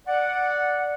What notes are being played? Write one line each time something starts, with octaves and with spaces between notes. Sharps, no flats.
D5 F#5